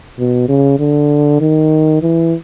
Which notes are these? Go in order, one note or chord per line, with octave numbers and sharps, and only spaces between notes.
B2
C#3
D3
D#3
E3